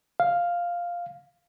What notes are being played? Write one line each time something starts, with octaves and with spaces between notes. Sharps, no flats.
F5